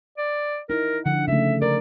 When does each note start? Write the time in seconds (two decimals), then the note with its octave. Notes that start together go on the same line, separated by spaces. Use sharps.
0.18 D5
0.70 D#4 E4 A#4
1.06 D3 F3 F#5
1.28 C#3 A3 E5
1.62 A#4 D5